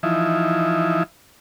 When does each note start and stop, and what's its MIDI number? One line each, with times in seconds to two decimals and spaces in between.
0.03 1.03 52
0.03 1.03 53
0.03 1.03 63
0.03 1.03 64